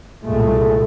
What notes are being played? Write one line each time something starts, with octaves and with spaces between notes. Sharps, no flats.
C2 A#2 G#3 A3